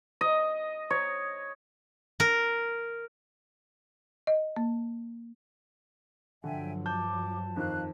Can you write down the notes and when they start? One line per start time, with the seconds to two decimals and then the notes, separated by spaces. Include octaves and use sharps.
0.21 D#5
0.90 C#5
2.20 A#4
4.27 D#5
4.57 A#3
6.44 G2 D3 F3 F#3 E5 G5 G#5
6.86 A5 D6 G6
7.56 F2 D#3 F5 F#6